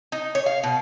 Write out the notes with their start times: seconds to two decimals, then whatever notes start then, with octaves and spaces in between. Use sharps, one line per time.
0.12 D#4
0.35 C#5
0.46 F5
0.63 B2